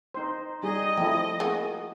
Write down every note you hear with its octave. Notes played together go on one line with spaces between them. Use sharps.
D#4 C5
G3 D#4 G#4 D#5
F3 A3 E4 G4
G#3 A#3 F#4